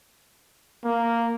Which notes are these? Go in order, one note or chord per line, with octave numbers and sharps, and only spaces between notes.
A#3